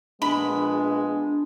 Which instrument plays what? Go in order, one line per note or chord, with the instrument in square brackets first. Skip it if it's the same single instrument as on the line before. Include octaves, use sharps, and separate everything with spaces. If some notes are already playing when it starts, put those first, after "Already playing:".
[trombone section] A#1 B3 [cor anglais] G#3 [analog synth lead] D4 [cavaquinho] B5